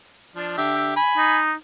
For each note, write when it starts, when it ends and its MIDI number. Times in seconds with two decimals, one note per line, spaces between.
0.36 0.57 53
0.36 0.57 62
0.58 0.96 50
0.58 0.96 67
0.58 0.96 76
0.96 1.38 80
0.96 1.38 83
1.17 1.54 63